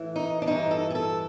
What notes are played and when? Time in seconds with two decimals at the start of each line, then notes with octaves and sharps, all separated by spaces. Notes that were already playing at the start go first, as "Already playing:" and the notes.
Already playing: A2 E3
0.16 D#4
0.42 D4
0.47 G2 E3 D#4
0.71 A4
0.90 G#4
0.95 A4